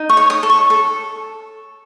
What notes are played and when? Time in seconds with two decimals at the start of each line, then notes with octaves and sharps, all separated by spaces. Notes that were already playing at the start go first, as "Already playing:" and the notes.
Already playing: D#4
0.09 C#6
0.17 C#5
0.30 D#6
0.43 A4
0.50 C#6
0.70 A4